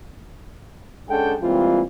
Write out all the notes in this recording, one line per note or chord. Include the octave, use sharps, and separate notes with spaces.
G#3 C#4 D4 A4 F#5 G5
E3 G3 G#3 A#3 C4 F4